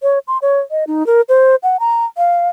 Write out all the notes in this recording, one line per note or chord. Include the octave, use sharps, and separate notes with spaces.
C#5
C6
C#5
D#5
D#4
A#4
C5
F#5
A#5
F5